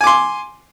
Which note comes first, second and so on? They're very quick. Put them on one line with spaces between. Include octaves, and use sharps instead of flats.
G#5 D6 C6